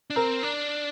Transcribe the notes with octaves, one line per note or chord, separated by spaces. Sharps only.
D4
C4 A#4
D4